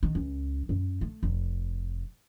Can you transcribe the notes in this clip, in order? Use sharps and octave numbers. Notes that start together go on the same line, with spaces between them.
D#3
C#2
F#2
A3
F1